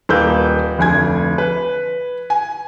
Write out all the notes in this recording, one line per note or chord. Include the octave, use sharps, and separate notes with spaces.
D#1 A#3 B4 E6 G6
F1 D2 G#5 G#6
B4
G#5